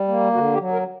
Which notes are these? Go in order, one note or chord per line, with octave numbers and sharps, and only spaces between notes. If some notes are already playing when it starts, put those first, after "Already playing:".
Already playing: G3
A#3
D3 F#4
G4
F#3
A#4